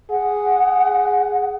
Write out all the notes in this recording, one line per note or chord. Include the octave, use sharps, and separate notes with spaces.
G#4 F#5